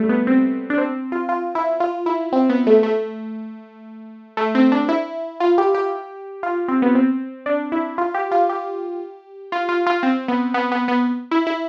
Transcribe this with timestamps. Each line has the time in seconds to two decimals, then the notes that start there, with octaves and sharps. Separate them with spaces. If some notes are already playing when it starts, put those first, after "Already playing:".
Already playing: G3 A3
0.09 B3
0.27 C4
0.70 D4
0.78 C4
1.12 F4
1.29 F4
1.55 E4
1.80 F4
2.06 E4
2.33 C4
2.50 B3
2.67 A3
2.83 A3
4.37 A3
4.55 C4
4.72 D4
4.89 E4
5.40 F4
5.58 G4
5.75 G4
6.43 F4
6.68 C4
6.82 B3
6.95 C4
7.46 D4
7.72 E4
7.98 F4
8.14 G4
8.31 F4
8.49 G4
9.52 F4
9.69 F4
9.86 F4
10.03 C4
10.28 B3
10.54 B3
10.72 B3
10.88 B3
11.31 E4
11.47 E4